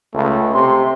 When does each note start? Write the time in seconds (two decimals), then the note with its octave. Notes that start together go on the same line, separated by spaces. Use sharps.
0.14 C#2 A3
0.54 C3 C6